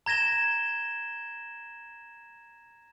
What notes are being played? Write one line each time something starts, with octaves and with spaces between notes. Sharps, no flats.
A#5 G#6 A#6 E7 G7